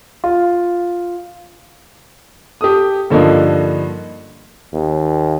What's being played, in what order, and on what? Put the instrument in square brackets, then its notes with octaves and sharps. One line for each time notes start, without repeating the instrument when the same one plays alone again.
[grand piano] F4
[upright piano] G4 A4 D#6
G2 D3 F3 A#3 D#4
[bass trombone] D#2